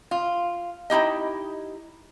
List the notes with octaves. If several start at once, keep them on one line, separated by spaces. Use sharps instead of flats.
F4
D#4 E4 G4 D#5